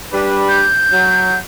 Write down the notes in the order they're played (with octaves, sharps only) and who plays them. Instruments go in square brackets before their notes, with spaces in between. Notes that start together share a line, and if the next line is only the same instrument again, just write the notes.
[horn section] G3 D4 B4
[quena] G6
[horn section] F#3